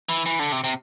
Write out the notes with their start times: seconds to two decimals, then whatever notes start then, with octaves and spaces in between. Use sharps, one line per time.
0.09 E3
0.26 E3
0.39 D3
0.52 C3
0.64 C3